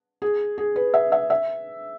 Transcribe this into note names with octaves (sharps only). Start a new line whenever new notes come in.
G#4
G#4
B4
E5
E5
E5